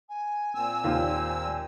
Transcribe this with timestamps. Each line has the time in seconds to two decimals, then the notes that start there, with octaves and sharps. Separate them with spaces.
0.09 G#5
0.55 A#2 C4 E6
0.84 D#2 F4 G#5